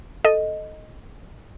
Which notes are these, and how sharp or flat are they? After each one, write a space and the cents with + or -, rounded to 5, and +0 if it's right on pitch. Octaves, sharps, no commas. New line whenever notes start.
A4 +0 D#5 +0